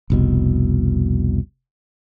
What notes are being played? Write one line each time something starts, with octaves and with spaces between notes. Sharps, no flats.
F1 C2 B2